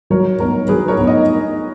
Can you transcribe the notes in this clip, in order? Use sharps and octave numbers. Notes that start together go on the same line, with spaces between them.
F#3 A#4 C#5
B3 D#4 A#4 C#5
F#3 G#4 B4
A#4 C#5
B3 D#4
D#5